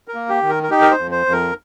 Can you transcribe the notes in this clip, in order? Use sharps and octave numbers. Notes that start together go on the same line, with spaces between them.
A#4
A#3
G4
D#3
A#4
A#4
D#4 G4
A#4
C5
F2
C5
F2
A#4